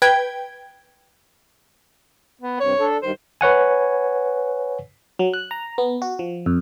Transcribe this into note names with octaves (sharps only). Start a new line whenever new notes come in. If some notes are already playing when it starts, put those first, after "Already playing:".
B4 G5 G#6
B3
G2 C3 C#5
D4 A4
G2 D#3 C5
B4 C#5 F#5 G#5
F#3
F#6
A#5
B3
F#4
F3
F2